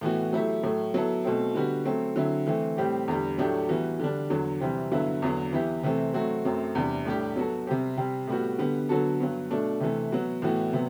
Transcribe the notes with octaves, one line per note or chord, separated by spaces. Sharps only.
A2 E3 B3 F#4
F#3 A3 E4 G4
A2 F#3 A3
F#3 B3 E4 A4
B2 A3 C4
D3 G3 B3 F#4
F#3 A3 C4
D3 F#3 C4 E4
E3 A3 C4
A2 G3 C4 G4
E2 D3 G3
A2 F#3 A3 D4 G4
E3 G3 B3 F#4
D3 G3 D4
E2 D3 F#3
C3 E3 G3 C4
G2 D3 F#3 B3 E4
E2 D3 F#3 B3
E3 B3 E4 G4
C3 E3 A3 C4
F#3 A3 C4 F#4
F#2 F#3 A3 C4
E2 C3 G3 D4
A2 G3 D4 G4
F#3 B3 F#4 A4
C3 G3 C4 G4
C3 G3 C4
A2 G3 B3 F#4
D3 G3 B3
D3 F#3 B3 F#4 A4
G2 F#3 B3
B2 A3 D4
C3 E3 A3
F#3 B3 F#4
A2 E3 B3 F#4
C3 F#3 B3